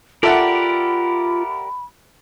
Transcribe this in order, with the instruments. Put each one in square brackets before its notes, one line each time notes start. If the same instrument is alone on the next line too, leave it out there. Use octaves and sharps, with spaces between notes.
[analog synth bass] F4 [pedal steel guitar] G4 A#4 D5 [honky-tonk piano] A4 E5 F#5 [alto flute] B5